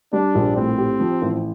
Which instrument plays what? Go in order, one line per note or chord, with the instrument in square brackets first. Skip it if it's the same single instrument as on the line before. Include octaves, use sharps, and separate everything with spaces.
[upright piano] G3 [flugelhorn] D4
[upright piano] A#1
[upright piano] A2 [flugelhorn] C4
[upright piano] G4
F3
A1